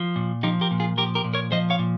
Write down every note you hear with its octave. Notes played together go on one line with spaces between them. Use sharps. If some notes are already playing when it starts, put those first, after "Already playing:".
Already playing: F3
A#2
F3 D#4 G4
G4 A#4
A#2
F4 G#4
F3 G4 A#4
G4 A#4
A#2
A#4 C#5
F3 C5 D#5
C#5 F5
A#2